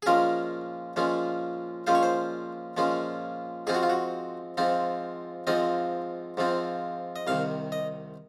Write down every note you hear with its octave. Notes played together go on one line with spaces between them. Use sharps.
G#4
A#2 F3 G#3 C#4 F4 A#4
A#2 F3 G#3 C#4 F4
A#2 F3 G#3 C#4 F4 C5
C#5
C5
A#2 F3 G#3 C#4 F4
G#2 F3 C4 F4 G#4
F#4
F4
F#4
G#2 F3 C4 F4
G#2 F3 C4 F4 D#5
G#2 F3 C4 F4
D#5
C2 C3 D#3 F5
D#5